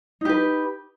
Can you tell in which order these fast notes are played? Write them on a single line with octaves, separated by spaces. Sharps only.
D#4 G4 B4